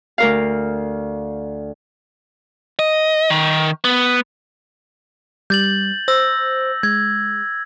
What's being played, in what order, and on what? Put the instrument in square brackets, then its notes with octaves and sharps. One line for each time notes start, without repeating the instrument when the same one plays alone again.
[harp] D2 A#4 F5
[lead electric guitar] D#5
D#3
B3
[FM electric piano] G3 [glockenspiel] G6 A6 F#7
[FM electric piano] C5 [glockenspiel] E6 A#6
[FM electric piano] G#3 [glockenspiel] G#6